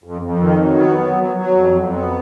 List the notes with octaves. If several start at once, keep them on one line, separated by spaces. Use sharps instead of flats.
F2
F2
D#3
F#3
B3
F#3
F#3
F#3
F2
F2
B3